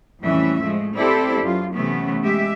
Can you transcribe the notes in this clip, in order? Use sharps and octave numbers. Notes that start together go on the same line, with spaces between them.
F2 A2 E3 G3 C#4 E5
F3 G#3 A3
C4 E4 G4 A4 C5 D5
F#2 F4
C3 E3 A3 B3 C#4
G#3 G4 E5